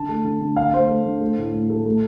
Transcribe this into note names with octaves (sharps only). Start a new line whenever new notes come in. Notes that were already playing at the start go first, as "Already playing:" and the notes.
Already playing: D3 A5
A3
D3
D3
D3 F5
A3 C5
A3
D3
A3
A2
A2
A3
A3